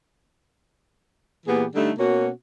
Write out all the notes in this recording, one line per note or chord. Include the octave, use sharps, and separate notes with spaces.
A#2 E3 B3 G4 G#4
D3 G3 A3 D#4
B2 A#3 C#4 F#4